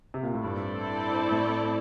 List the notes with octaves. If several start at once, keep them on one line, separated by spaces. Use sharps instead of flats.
C3
A#2
A2
G2 C4 E4 A4 D5
A2